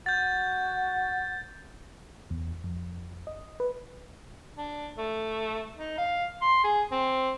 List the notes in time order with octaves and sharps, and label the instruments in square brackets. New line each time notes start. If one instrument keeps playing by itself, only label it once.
[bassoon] F#4 [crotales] G6 A6
[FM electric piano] E2
F2
D#5
B4
[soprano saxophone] D4
A3
D#4
F5
C6
G#4
C4